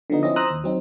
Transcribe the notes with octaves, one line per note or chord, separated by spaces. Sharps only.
D3 F3 B3 D#4
F3 C4 C#4 E4 D#5
C5 A#5 D#6 E6 F#6
D#2
F#3 C4 D#4